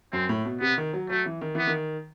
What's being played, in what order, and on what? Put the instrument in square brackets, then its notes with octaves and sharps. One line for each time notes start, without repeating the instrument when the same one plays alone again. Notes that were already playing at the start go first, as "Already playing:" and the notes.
[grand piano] F#2 [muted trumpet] C4
[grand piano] A2
B2
[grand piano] C3 [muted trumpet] B3
[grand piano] D#3
F#3
[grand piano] F#3 [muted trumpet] A3
[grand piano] E3
D#3
[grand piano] E3 [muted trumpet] B3
[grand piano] D#3